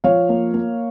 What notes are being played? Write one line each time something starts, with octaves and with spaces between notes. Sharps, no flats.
F3 C#5 F5
A#3
A#3